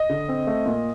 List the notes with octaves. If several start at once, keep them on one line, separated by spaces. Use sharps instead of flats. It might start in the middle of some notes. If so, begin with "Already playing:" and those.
Already playing: D#5
D3
C4
A3
A#2